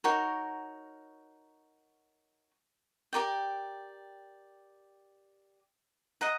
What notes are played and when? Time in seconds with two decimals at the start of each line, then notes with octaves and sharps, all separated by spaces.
0.04 D#4 F#4 A#4 C#5
3.13 G4 A#4 D5 G5
6.21 D#5 F#5 A#5